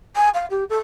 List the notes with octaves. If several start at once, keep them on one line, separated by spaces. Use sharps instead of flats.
G#5
F5
G4
A4